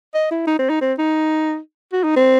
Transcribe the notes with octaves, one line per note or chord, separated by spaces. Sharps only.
D#5
E4
D#4
C4
D#4
C4
D#4
F#4
D#4
C4